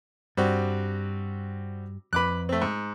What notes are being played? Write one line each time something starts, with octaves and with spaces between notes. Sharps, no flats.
G2 G3 C4 F#4
F2 B4 B5 D6 F#6
A3 C4
G#2